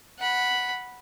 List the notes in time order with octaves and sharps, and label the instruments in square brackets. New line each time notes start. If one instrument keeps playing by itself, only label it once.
[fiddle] F#5 B5